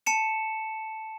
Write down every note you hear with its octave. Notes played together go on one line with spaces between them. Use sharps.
A5 C#7 E7